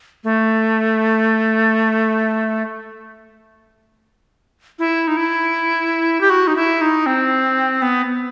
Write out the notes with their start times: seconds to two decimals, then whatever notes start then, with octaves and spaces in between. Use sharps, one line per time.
0.24 A3
4.79 E4
5.08 D#4
5.17 E4
6.21 G4
6.30 F#4
6.47 D#4
6.56 E4
6.81 D#4
7.06 C4
7.82 B3